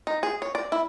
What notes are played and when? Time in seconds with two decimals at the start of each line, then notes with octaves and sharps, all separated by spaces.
0.07 D#4
0.23 G#4
0.42 C#5
0.55 D5
0.72 E4